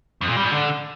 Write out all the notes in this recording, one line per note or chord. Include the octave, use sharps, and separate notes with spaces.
F2
A#2
G3
G#2
D3